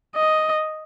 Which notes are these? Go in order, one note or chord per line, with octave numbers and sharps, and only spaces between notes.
D#5